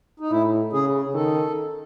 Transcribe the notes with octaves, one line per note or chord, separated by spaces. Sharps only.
D#4
A2 E4
C#3 G#4
D#3 A4